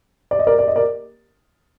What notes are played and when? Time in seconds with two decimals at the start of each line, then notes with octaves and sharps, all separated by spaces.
0.31 D5
0.39 D#5
0.47 A#4 D5
0.59 D5
0.68 D#5
0.76 A#4 D5